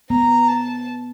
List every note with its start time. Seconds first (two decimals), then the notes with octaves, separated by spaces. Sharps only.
0.10 B3 A#5
0.48 A5